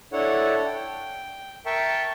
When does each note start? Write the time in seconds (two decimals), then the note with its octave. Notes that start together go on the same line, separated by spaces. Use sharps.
0.13 D4 E4 A4 C#5 F#5
0.66 G5
1.66 A#4 E5 G5 A5 C#6